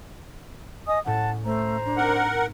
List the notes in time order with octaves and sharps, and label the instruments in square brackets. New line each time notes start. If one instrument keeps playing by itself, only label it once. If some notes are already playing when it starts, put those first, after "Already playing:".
[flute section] D#5 G#5 D#6
[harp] A2 C#4 [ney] F#5 [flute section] A5
[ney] A3 [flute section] C5 A#5
[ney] D4
[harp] C4 D#4 [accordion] A#4 F#5